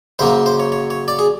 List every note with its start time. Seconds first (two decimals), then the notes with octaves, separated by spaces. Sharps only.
0.19 F#2 C#3 F#3 A#3 C5
0.46 C5
0.60 C#5
0.72 C#5
0.90 C#5
1.08 D5
1.19 G#4